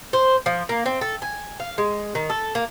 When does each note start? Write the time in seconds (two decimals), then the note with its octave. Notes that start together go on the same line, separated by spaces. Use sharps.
0.13 C5
0.46 F3
0.69 A#3
0.86 C4
1.01 A4
1.22 G#5
1.60 F5
1.78 G#3
2.15 D#3
2.30 A4
2.55 A#3